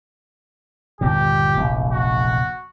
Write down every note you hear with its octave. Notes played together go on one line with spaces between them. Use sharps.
G1 D#2 A#2 G4
F1 A#1 E2
F#4